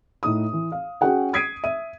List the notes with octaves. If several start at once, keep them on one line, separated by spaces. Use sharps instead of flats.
A2 D#4 D#6
E3
F5
C#4 F#4 G#4 F#5 G5
D#6 G#6 B6 C7 D7 D#7
E5 D#7